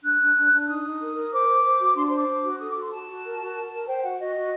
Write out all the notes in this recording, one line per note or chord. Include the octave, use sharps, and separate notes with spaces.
D4 F#6
D4
D4
D4
D#4 D#6
D#4
A#4
A#4
C5 D6
C5
C5
F#4
D4 C6
C5 C6
D6
D4
F#4
A4 D#6
D6
F#4 C6
F#4 A5
F#4
A#4
F#4
A#4
A#4
C5 G5
F#4 F#5
F#4 D#5
F#4